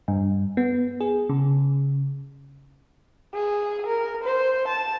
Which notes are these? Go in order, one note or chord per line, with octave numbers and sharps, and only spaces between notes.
G2
B3
G#4
C#3
G#4
A#4
C5
A5